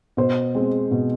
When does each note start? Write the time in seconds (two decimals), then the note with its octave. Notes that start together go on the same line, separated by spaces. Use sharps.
0.17 B2 C5
0.55 G#3 C4
0.91 B2